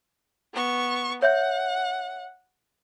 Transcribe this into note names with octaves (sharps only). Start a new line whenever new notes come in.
B3 C#6
C#5 E5 F#5 G6